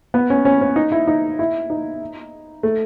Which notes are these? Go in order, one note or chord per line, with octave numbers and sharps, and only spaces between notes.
B3
C#4
C#4
C#4
D#4
E4
D#4
E4
D#4
A3